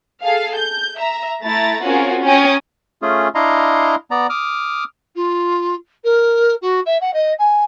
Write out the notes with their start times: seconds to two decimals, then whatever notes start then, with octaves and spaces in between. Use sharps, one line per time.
0.24 G#4 A4 F5
0.57 G6
0.97 E5 A#5
1.43 A3 E4 A#5 A6
1.83 C4 C#4 F4 F#4 G#4 A#4
2.23 C#4 G5 G#5 A#5 D#6
3.02 A3 C#4 F4 G#4
3.35 D4 E4 D#5 F5 A#5 C6
4.11 B3 D5 A#5
4.30 D6 D#6 F6
5.15 F4
6.04 A#4
6.61 F#4
6.85 E5
7.01 F#5
7.13 D#5
7.38 G#5